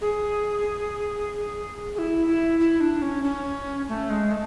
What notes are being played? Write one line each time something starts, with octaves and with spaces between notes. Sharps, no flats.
G#4
G#4
E4
E4
E4
D4
C#4
C#4
A3
G#3
A3